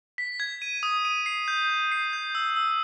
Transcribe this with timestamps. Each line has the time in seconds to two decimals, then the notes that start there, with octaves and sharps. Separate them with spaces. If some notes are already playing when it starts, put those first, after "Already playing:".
0.18 B6
0.40 G#6
0.62 D#7
0.83 D#6
1.05 D#7
1.26 C7
1.48 G6
1.70 G6
1.91 C7
2.13 G6
2.35 E6
2.56 E6